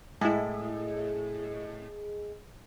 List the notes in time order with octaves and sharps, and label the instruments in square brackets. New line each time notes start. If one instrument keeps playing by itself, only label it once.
[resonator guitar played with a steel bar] A2 [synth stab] G#3 E4 [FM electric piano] G#4 D#5